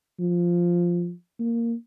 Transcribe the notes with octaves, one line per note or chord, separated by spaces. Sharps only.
F3
A#3